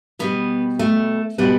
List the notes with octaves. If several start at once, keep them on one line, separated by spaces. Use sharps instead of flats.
B2 G3 B3
A3
B2 G3 B3